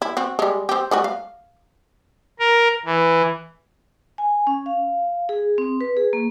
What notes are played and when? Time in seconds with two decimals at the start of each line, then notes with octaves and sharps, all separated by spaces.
0.02 E4
0.17 C4 F#4
0.39 G3 G#3
0.69 C4 G4
0.91 G3 A3 F#4
1.04 F5
2.39 A#4
2.86 E3
4.18 G#5
4.47 C#4
4.66 F5
5.29 G#4
5.58 C4
5.81 B4
5.97 G#4
6.13 A#3